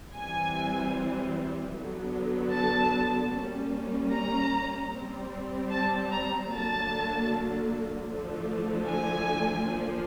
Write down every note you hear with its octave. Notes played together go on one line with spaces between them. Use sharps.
E3 G3 C4 G#5
D3 F#3 B3
A5
G3 A#3 C#4
A#5
G3 C4
A5
A#5
D3 F#3 A#3 A5
D3 F3 A3
G#5
F3 A#3 D4